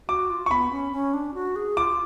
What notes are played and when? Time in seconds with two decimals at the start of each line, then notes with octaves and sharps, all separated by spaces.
0.08 F#4 D6
0.30 F4
0.46 C#6
0.51 B3 B5
0.71 C#4
0.92 C#4
1.14 D4
1.34 F#4
1.56 G#4
1.77 F4 D6